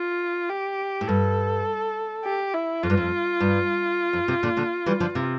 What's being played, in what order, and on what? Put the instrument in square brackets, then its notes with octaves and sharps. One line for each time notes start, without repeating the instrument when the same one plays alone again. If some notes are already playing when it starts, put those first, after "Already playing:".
Already playing: [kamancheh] F4
G4
[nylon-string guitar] A2
[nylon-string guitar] G2 [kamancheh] A4
[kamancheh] G4
E4
[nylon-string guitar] F2 [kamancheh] F4
[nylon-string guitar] G2
F2
G2
F2
C3
A#2 D3
A#2 D3
E3 G3
D3 F3
C3